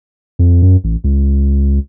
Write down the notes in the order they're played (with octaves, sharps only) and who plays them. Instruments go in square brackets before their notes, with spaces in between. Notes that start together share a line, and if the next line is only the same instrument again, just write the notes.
[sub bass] F2
F#2
A1
C#2